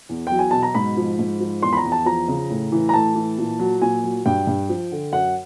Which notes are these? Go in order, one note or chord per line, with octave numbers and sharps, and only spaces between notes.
E2
F#3 G5
G#5
B2 A5
A#5
G#2 B5
F3
G#2
F3
E2 C6
B5
A#5
E2
A5
F3 A#5
C#3
A2
E3
A#5
A2 A5
E3
A#2
F#3
A#2 G#5
F#3
G2 G5
G2
F3
D3
F#2 F#5